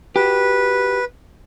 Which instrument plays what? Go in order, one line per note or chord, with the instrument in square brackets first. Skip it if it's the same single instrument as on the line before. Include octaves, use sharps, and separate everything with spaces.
[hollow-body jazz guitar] F#4 G4 [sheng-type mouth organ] B4